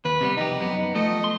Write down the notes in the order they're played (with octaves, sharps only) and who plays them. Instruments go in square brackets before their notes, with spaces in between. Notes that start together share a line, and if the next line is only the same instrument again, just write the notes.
[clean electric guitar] D#2 [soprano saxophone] B4
[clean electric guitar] C3 G3 B3
[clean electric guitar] C2 F2 G4 [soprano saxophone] D#4
[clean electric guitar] F#2 B3
[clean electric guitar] F3 A3 A4 [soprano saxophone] D#5
[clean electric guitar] C6